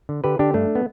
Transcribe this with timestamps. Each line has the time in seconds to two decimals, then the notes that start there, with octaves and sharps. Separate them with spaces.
0.09 D3
0.24 D3 G4 B4
0.39 D3 D4 G4
0.54 G2 A3 D4
0.75 B3